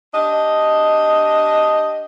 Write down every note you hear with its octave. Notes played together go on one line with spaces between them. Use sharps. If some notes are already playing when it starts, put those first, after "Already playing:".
D4 G4 D#5